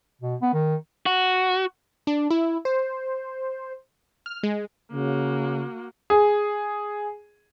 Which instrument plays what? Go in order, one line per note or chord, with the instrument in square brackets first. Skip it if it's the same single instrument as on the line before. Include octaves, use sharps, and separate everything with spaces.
[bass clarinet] B2
B3
D#3
[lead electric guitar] F#4
[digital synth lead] D4
E4
C5
F6
G#3
[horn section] C#3 [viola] A#3 F#4
[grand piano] G#4